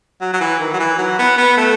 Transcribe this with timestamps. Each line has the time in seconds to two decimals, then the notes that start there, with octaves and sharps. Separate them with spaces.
0.21 F#3
0.33 F#3
0.41 E3
0.60 D#3
0.73 F#3
0.79 E3
0.98 F#3
1.19 B3
1.38 B3
1.57 A3